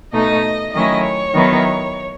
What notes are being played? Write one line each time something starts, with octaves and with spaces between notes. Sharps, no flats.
B2 A3 D#4 D#5
D#3 F#3 A3 C#4 E4 D#5
C#5
D#3 F#3 B3 E4